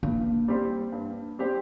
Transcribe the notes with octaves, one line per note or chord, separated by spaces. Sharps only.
G2 A#3
G3 C4 G4 C5
G2
G3 C4 G4 C5